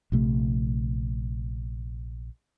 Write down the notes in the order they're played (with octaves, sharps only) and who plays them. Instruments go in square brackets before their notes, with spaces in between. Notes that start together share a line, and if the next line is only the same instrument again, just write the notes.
[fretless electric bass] A#1 C3 A3